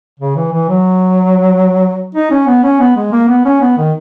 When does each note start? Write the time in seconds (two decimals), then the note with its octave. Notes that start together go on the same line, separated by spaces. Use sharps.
0.20 C#3
0.36 E3
0.52 E3
0.68 F#3
2.15 D#4
2.31 C#4
2.47 B3
2.63 C#4
2.80 B3
2.96 G#3
3.12 A#3
3.29 B3
3.45 C#4
3.61 B3
3.77 D#3